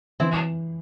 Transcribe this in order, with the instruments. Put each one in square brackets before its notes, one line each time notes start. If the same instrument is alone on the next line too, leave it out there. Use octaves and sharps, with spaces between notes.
[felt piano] E3 [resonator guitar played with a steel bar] C4 E4